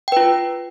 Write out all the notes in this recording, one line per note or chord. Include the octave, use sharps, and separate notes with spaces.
F4 B4 G5